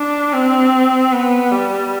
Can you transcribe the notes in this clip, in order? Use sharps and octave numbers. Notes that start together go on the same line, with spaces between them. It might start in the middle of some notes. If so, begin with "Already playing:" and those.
Already playing: D4
C4
B3
G3